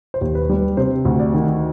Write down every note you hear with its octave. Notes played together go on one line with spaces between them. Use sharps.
C5
D#2
B4
G3
B4
C3 C5
D2
D5
D#3